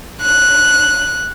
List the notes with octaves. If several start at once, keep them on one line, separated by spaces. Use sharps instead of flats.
F#6